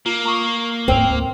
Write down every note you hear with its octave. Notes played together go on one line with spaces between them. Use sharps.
A#3 F4 A#5
A#5 C#6 D#6
D2 G#2 C4 G5 E6 F7